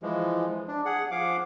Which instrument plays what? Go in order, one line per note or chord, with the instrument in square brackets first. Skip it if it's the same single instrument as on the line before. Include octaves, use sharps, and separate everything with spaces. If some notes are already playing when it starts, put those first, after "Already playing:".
[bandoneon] E3 F3 G#3
D4
G#4 F#5
F3 F5 F#5 D6